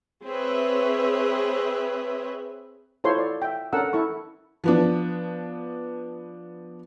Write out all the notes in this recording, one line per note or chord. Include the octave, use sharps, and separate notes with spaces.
C4 G#4 B4 C#5 E5
E4 F4 A4 C5 C#5 C6
D5
E5 G5
C#4 D4 A4 A#4 F#5 E6
E4 A4 C#6
F3 B3 D4